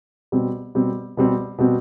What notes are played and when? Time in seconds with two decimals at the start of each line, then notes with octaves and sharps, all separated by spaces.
0.32 B2 G3 C4
0.75 B2 G3 C4
1.17 B2 G3 C4
1.58 B2 G3 C4